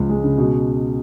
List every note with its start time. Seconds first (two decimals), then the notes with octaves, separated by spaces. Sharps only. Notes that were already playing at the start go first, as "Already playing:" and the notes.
Already playing: C#2 F3
0.09 G#3
0.24 C#3
0.38 B2